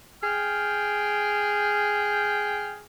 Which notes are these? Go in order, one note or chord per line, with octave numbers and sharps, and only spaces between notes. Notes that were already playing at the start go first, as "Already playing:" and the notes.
G#4 G5 F6